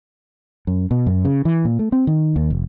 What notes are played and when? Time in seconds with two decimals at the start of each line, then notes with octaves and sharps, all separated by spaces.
0.67 F#2
0.91 B2
1.06 F#2
1.25 C#3
1.45 E3
1.65 A#2
1.79 A3
1.92 C4
2.07 D#3
2.36 D#2
2.50 F1